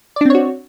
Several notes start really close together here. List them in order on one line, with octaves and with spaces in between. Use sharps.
D5 D4 C4 C#5 F#4